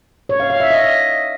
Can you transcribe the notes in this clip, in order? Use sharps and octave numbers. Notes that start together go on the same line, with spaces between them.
C#5
F5
F5
E5
D#5